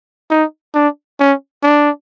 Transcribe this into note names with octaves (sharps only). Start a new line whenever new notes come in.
D#4
D4
C#4
D4